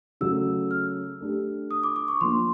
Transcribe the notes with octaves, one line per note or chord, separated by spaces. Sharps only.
C#3 F#3 A3 E6
F6
A3 D4 G4
D#6
D6
D6
C#6
F3 A#3 D4 C6